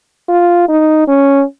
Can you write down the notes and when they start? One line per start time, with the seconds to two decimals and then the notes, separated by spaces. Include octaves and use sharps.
0.28 F4
0.68 D#4
1.08 C#4